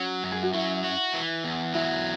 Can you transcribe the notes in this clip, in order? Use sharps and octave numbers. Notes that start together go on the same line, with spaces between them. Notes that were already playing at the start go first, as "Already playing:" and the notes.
Already playing: F#3 C#4
F#2
G#4
F#4
F#3 E4
F#4
E3
E2
F#3 E4